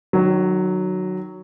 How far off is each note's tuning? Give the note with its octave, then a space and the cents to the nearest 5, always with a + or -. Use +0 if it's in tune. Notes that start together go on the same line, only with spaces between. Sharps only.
D#3 -30 F#3 +0